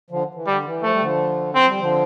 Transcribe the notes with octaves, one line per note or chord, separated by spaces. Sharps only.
D3 F3
E3
D3 G3
E3
F3 A3
G3
D3 F3
F3 C4
G3
D3 F3